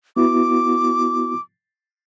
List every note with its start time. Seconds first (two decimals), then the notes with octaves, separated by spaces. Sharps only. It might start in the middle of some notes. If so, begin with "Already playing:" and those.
0.16 B3 E4 F#4 D6